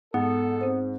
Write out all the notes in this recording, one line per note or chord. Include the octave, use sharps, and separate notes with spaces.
G#2 B3 A4
C4 C5